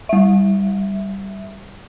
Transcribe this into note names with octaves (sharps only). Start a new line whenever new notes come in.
G3 E5